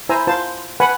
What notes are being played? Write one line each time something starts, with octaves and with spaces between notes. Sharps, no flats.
E4 C5 G#5 A#5 E6
F4 C5 A5
B4 F#5 G#5 B5